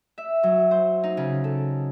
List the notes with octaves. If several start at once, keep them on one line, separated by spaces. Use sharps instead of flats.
E5
F#3
C5
D#4
C#3
A4